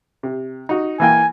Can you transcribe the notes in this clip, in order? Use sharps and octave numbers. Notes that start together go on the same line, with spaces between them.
C3
D#4 F#4
E3 A#3 G5 G#5